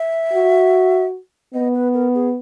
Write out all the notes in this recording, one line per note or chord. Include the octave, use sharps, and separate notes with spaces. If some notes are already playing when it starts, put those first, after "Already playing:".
Already playing: E5
F#4
B3 D#5
B4
A#4
G#4